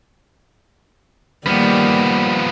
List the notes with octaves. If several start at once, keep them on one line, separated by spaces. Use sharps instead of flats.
D#3 F3 G3 A#3 B3